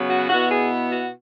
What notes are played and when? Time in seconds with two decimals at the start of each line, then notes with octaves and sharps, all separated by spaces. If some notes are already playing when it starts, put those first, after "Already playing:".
Already playing: C#3 F#3 B3
0.10 F#4
0.30 B2 B3 E4 F#4
0.51 G#4
0.92 F#4